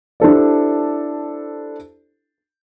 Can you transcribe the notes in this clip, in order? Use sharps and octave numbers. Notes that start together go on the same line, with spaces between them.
D4 E4 G4 A4 C5 D5